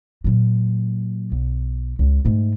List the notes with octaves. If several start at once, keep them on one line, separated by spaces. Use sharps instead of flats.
A#2 F#3
B1
C#2
G#2 A3